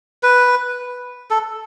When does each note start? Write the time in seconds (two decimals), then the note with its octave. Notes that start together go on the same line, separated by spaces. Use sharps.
0.23 B4
1.30 A4